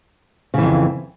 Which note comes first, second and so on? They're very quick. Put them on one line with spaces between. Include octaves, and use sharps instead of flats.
C#3 E3 F2